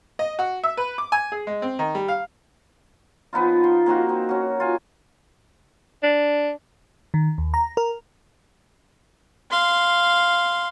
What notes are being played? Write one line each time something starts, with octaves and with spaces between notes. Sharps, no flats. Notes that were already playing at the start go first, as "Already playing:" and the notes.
D#5
F#4
E5
B4
D6
G#5
G#4
G#3
C4
D#3
G3
F5
F3 B3 D#4 F4
C6
A#3 C4 D#4 F#4
C4
C#4 F#4
F4 G#5
D4
D#3
D#2
A#5
A#4
F5 C6